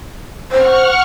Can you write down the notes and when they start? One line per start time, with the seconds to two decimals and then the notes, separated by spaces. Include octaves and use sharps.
0.52 C5 F#5 C#6 F6